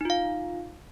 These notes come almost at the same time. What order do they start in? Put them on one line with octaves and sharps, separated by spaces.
D#4 F4 F5